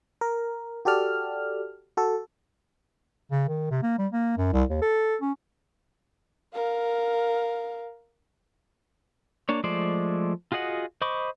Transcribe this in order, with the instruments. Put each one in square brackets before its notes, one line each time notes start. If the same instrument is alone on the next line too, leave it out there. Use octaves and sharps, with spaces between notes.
[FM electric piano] A#4
F#4 G4 A4 D5 F6
F#4 A4
[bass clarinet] C#3
D#3
C3
A#3
G3
A#3
F#2
C2
D#2
A4
C#4
[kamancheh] A#4 F5
[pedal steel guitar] A#3 D4 C#5
F3 G#3 A3 C5 D5
F4 F#4 G#4 D#5 F#5
C5 D#5 B5 C#6 D6